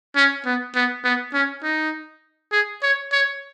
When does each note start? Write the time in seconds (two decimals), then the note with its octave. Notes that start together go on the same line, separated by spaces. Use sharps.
0.16 C#4
0.45 B3
0.75 B3
1.04 B3
1.33 C#4
1.63 D#4
2.52 G#4
2.82 C#5
3.12 C#5